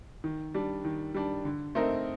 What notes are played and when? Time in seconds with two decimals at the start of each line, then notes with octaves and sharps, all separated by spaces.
0.24 D#3
0.54 G3 D4
0.85 D#3
1.14 G3 D4
1.45 D3
1.75 A3 C4 D#4 A#4